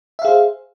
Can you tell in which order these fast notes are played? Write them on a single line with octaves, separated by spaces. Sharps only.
E5 F5 G#4 C5